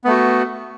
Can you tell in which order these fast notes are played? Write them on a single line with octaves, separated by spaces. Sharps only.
B3 A3 F#4